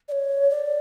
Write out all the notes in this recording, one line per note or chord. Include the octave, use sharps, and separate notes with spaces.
D5
C#5
D5